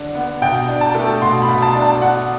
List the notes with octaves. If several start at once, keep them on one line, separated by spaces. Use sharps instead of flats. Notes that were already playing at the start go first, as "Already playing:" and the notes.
Already playing: D3 D4
B3
B2 G5
D4
A5
A3
B2 C6
B5
B2
A5
D4
A5
D4 F#5